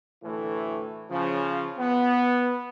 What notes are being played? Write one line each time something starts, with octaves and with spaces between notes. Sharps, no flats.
D2 A2 E3 A3
C#3 F3
B3